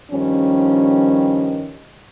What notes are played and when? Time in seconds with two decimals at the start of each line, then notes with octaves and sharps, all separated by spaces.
0.12 G2 D#3 F3 G3 C#4